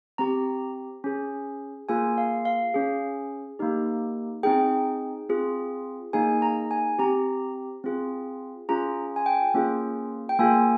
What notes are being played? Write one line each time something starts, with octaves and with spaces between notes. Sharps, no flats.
C4 G4 A#5
C#4 G#4
A#3 F4 G#4 G#5
F5
F5
C#4 G#4
A#3 D#4 G4
C4 D#4 G#4 G5
C4 F4 G#4
A#3 D#4 G#4 G#5
A#5
G#5
C4 G4 A#5
C4 F4 G#4
C#4 F4 G#4 A#5
G#5
G5
A#3 C#4 F4 G#4
G5
A#3 F4 G#4 G#5